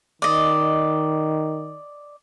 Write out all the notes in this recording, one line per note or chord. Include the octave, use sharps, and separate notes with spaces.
D#3 D5 D#5